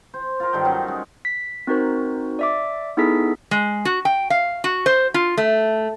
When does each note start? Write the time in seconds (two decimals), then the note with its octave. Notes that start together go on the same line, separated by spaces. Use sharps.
0.14 C5
0.40 F4 A#4
0.53 G2 D#3 A4 G5
0.65 D#3 F#3 C#4
0.88 G#3
1.25 B6
1.67 C4 D#4 F#4 A#4 C5
2.39 D5 E5 D6
2.97 B3 D#4 E4 G#4 A4 B6
3.51 G#3
3.85 F#4
4.05 G5
4.30 F5
4.64 F#4
4.86 C5
5.14 F4
5.37 A3